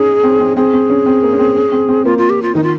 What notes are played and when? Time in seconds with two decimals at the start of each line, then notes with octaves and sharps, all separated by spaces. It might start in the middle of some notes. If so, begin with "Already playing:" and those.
Already playing: C#4 D#4 G#4
0.23 C4
0.40 C4
0.57 C4 G#4
0.74 C4
0.90 C#4
1.06 C4
1.23 A#3
1.33 C#4
1.39 C4
1.56 C#4
1.72 C4
1.89 C4
2.05 A#3 F4
2.18 F4
2.30 G4
2.43 F4
2.55 D#3 D#4
2.63 F4